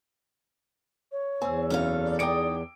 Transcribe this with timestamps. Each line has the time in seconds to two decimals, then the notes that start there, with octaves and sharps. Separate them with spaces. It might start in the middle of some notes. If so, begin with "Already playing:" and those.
1.12 C#5
1.42 E2 C4 G#5 E6
1.70 F#2 C3 E3 C#4 A4 F5
2.04 D5
2.19 D#4 G#4 A4 G5 D6 D7